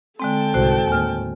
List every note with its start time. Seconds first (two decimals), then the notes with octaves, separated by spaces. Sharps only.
0.20 D3 G#3 C4 A4 G5 A5
0.54 C2 G#2 F#4 C5
0.88 D#2 A2 G#5 F6